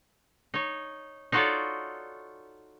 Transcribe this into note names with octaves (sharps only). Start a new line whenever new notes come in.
D#4 C#5
D#4 F4 F#4 A4 C#5 D5